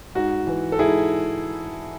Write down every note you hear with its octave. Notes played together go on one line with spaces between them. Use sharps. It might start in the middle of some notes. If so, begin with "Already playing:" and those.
G#2 F#4
E3
A4
G#2 E4 G#4